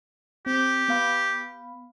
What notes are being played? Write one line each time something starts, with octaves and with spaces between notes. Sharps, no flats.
C4 G4
B3 F5 B5